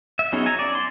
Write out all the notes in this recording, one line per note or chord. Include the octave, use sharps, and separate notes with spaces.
E5
F#3 B3 C#4 D#4 G#4
G#5 A#5
D5
C6